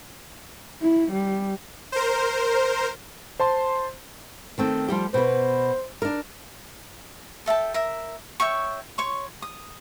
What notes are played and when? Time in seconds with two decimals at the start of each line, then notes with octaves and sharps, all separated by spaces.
0.82 E4
1.12 G3
1.92 A#4 C5
3.40 C5 A5 C6
4.58 D#3 A3 C4
4.88 F3 G3 G4
5.14 B2 B4 C5
6.02 D4 A#4
7.46 A4 E5 G5 A5
7.74 A#4 E5
8.40 C#5 E5 G5 C#6
8.98 C#5 C6 C#6
9.42 D#6